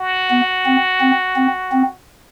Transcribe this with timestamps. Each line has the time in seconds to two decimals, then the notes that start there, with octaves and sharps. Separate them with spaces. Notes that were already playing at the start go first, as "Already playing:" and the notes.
Already playing: F#4
0.30 B3
0.66 C4
1.00 C4
1.36 C4
1.72 C4